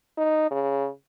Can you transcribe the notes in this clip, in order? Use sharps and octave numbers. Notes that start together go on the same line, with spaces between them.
D#4
C#3